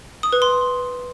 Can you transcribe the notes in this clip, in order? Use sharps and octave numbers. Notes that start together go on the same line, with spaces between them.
D#6
B4
C6